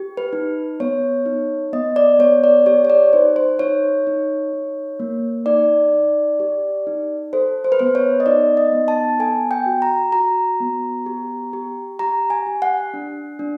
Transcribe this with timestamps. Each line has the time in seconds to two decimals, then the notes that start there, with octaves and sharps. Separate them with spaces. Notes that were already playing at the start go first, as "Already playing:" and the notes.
Already playing: G4
0.17 B4
0.33 D#4
0.80 B3 C#5
1.26 D#4
1.73 B3 D#5
1.96 D5
2.19 B3 C#5
2.44 D5
2.66 G4 C#5
2.85 C#5
2.90 D5
3.13 D#4 C5
3.36 C5
3.59 D#4 C#5
4.07 D#4
4.53 D#4
5.00 A#3
5.46 D#4 D5
5.93 D#4
6.40 G4
6.87 D#4
7.33 A4 C5
7.64 C5
7.72 B4
7.79 B3 C5
7.95 C#5
8.20 D#5
8.26 D#4 D5
8.57 D#5
8.73 B3
8.88 A5
9.20 A4 G#5
9.51 G5
9.66 F#4
9.82 A#5
10.12 F#4 A#5
10.60 B3
11.06 G4
11.53 G4
11.99 G4 A#5
12.30 G#5
12.47 G4
12.62 F#5
12.94 D4
13.39 D4